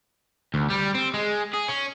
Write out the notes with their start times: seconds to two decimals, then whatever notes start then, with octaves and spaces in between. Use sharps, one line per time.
0.54 D2
0.70 G3
0.95 C4
1.14 G#3
1.54 G#4
1.69 C#4